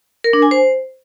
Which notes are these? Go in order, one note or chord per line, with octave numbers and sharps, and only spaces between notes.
A#4
D4
G#5
C5